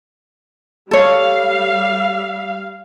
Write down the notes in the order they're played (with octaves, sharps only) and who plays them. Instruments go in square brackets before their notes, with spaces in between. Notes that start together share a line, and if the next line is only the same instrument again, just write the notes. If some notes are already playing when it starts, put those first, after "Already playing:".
[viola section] G3 F5 [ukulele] A4 C#5